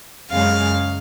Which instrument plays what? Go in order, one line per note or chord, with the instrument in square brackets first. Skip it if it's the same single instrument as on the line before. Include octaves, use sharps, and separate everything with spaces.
[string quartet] F#2 C#3 G#3 F5